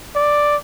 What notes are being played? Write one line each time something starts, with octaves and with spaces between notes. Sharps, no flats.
D5